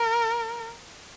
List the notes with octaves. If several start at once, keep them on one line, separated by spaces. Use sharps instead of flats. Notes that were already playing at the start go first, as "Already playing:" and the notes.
Already playing: A#4